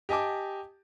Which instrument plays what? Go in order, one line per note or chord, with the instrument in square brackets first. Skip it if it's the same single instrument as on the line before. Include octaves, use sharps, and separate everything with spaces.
[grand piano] G4 D#5 G#5 A5 D6